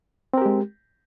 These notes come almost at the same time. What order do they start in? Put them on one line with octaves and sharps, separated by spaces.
C4 A#4 G4 G#3